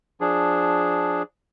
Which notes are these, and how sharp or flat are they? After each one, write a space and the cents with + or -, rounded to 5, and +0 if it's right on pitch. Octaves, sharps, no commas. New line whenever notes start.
F3 +10 D4 +0 G#4 +0